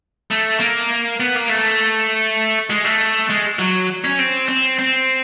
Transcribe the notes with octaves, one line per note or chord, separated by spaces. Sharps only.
A3
A#3
B3
A#3
A3
G#3
A3
G#3
F#3
C#4
C4
C4
C4